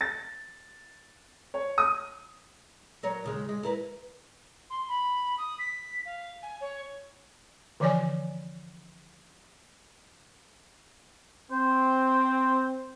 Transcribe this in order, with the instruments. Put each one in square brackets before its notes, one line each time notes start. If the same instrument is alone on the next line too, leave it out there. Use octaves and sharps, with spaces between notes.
[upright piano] A6
C#5
D#6
[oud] F#3 A#4 C#5
D#2 C#3 G#3
G#3
E4 A#4 B4
[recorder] C6
B5
D#6
B6
F5
G#5
C#5
[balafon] D3 E3 F3 C#5 D5 G#5
[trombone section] C4 [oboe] C5